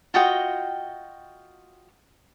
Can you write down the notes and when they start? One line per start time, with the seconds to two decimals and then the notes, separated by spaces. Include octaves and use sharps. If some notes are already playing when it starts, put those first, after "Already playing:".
0.14 F4 F#4 D#5 G5